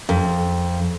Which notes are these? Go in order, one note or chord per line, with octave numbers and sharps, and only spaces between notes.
F2